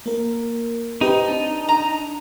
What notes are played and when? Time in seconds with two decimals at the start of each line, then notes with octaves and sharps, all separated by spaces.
0.06 A#3 A#4
1.01 C4 D#4 G4 B4
1.27 D4 A5
1.69 A#5